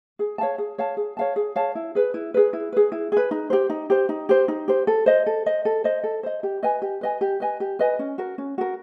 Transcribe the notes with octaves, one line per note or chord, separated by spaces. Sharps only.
G#4
C#5 F5 A5
G#4
C#5 F5 A5
G#4
C#5 F5 A5
G#4
C#5 F5 A5
E4
G#4 B4
E4
G#4 B4
E4
G#4 B4
E4
G#4 B4
D#4
G4 C5
D#4
G4 C5
D#4
G4 C5
D#4
G4 C5
A4
C5 D#5
A4
C5 D#5
A4
C5 D#5
A4
C5 D#5
G4
B4 D#5 G#5
G4
B4 D#5 G#5
G4
B4 D#5 G#5
G4
B4 D#5 G#5
C#4
F#4 A#4
C#4
F#4 A#4